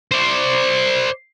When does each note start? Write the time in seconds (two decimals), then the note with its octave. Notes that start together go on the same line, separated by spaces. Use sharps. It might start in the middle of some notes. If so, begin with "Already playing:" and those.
0.11 C5 D5